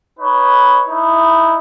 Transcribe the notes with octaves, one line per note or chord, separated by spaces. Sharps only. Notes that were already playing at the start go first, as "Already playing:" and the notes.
D#4 B4 C#5
D#4 E4 D#5